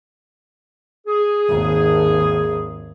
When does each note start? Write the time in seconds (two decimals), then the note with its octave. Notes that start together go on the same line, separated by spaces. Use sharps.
1.07 G#4
1.49 G#1 D#2